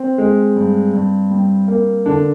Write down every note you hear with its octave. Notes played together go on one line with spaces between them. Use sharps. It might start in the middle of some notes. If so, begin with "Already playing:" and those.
Already playing: C4
G#3
G2
G2
G3
A#3
D3 D4